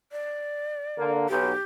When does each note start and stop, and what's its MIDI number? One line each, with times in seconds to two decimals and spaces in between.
0.12 1.16 74
0.97 1.27 50
0.97 1.27 58
1.29 1.51 35
1.29 1.63 67